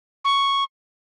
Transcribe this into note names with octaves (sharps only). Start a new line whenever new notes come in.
C#6